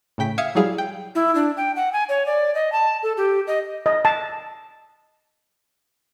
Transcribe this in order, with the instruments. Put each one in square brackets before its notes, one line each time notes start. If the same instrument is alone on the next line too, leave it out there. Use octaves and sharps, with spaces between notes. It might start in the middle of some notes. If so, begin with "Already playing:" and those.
[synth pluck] A2 C#3 G5 B6
E5 F5 D#6 G#6 C#7
F#3 G3 E4 G#4 F5
G5
[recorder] E4
D4
G5
F#5
G#5
C#5
D5
D#5
A5
A4
G4
D#5
[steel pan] D#5
A5